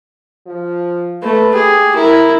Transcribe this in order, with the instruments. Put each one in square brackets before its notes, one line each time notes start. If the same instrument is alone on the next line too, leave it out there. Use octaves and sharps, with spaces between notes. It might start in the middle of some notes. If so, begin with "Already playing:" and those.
[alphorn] F3
[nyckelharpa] A3 [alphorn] B4
[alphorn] G4 [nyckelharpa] G#4
[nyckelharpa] E4 [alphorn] A#4